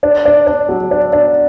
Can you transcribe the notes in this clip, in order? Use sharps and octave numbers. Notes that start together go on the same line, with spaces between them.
D4
D4
D4
F#3
D4
D4